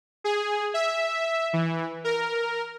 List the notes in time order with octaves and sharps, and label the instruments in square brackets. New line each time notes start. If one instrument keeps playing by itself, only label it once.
[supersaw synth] G#4
E5
E3
A#4